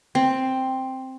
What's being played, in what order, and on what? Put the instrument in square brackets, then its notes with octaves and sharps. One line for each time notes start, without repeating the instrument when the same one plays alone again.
[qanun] C4